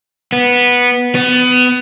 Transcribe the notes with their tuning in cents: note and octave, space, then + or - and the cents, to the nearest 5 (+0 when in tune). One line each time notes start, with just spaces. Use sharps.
B3 -10
B3 +20